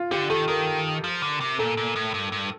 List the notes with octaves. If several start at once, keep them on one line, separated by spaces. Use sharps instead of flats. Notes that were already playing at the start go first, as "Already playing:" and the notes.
Already playing: F4
D3 G4
D#3 A4
D#3 A#4
F3
D3
C3
A#2 A4
A#2
A2
G2
G2